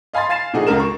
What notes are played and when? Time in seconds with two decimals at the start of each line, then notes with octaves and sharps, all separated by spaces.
0.13 D#5 F5 G#5 B5 C6 A6
0.29 F5 G#5 A6 C7 E7
0.53 A#2 F3 D#4 F#4 G#4
0.67 C#2 C#3 G#3 A#4 E7
0.80 C#6